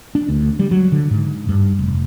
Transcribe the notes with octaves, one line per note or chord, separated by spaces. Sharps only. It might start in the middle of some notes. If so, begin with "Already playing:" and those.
D4
D2
G3
F#3
D3
G#2
G2
F1